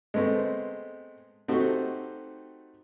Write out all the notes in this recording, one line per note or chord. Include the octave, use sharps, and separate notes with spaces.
G#3 A3 B3 C4
A3 C4 D#4 F#4 G4